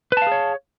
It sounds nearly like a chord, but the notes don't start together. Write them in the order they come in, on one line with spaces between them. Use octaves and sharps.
B4 A5 F5 G#4 C#5